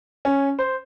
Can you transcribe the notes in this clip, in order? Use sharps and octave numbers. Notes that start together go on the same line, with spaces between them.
C#4
C5